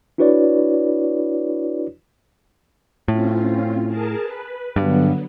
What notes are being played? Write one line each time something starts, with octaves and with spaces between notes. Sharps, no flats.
D4 E4 F#4 B4 C#5 D5
A2 C4 C#4 F4
G#4 A#4 A5
B4
G2 D3 F#3 B3